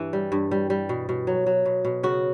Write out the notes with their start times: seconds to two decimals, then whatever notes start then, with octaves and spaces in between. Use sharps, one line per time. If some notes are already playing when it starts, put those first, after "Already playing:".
Already playing: G2 E3
0.13 G3
0.32 G2
0.51 G3
0.70 G3
0.89 B2
1.09 B2
1.27 F#3
1.47 F#3
1.65 B2
1.85 B2
2.03 C#3 F#4